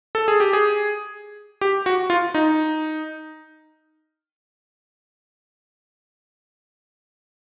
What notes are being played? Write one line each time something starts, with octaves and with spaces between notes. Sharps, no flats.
A4
G#4
G4
G#4
G4
F#4
F4
D#4